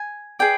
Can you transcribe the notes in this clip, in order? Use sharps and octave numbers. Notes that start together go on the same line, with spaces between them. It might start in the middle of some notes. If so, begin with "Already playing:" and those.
Already playing: G#5
G#4 B4 D5 G5